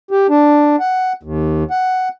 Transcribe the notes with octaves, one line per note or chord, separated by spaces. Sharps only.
G4
D4
F#5
D#2
F#5